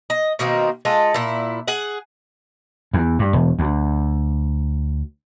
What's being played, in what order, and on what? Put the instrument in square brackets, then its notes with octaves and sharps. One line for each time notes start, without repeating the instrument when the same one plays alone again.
[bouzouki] D#5
B2 D#3 A#3 C4
G#3 F4 A4
A#2 E4
G#4 F#5
[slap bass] E2
G2
E1
D2